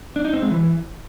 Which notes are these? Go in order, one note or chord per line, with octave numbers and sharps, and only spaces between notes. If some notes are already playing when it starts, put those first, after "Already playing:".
D4
D#4
C4
G#3
E3